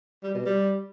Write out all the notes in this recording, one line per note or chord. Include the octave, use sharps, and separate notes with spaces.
G3
B2
G3